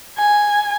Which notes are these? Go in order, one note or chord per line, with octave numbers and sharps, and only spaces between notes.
G#5